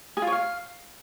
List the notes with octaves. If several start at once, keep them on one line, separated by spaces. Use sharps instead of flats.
G#4
F4
C#5
F5